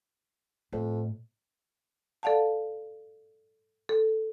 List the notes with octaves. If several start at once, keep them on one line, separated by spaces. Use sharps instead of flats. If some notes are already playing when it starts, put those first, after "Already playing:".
F2 A2
A4 D5 F5 F#5 A5
A4